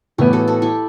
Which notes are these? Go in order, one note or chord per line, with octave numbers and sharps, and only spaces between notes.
A2 E3 B3 E4 G4
F#4 A4
F#4 A4
E4 G4